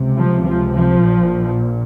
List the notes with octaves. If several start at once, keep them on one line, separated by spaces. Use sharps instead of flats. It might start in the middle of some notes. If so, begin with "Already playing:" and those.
Already playing: C#2 C3
F3
F3
F3
A#1 A#2